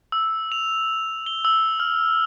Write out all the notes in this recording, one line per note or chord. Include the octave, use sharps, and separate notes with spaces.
E6
F7
G7
E6
F6